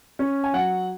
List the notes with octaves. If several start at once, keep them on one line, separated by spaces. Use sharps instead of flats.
C#4
G#5
F#3 F#5